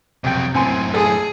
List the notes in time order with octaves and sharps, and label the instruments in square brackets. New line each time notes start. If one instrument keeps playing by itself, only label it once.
[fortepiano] C2 G5 [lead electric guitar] F2 F#3
[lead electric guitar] F#2 A2 [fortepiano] C4 G#5 C6
[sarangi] G#4 [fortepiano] A4